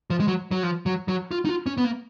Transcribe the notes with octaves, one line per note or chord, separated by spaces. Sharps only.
F3
G#3
F#3
F#3
F3
F#3
F#3
F4
D#4
F4
C#4
B3
A#3